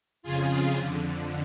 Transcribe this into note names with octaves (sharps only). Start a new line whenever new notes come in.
F2 C#3 F4 G#4
F2 D3